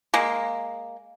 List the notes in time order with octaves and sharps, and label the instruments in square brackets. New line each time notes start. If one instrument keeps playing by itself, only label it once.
[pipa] G#3 A#3